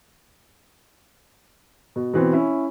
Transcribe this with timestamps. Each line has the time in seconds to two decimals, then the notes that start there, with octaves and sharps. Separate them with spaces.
1.96 B2
2.13 B2 E3 C4
2.33 C#4 E4